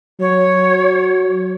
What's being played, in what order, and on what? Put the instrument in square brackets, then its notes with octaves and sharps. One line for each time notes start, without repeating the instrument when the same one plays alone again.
[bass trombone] F#3 [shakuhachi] C#5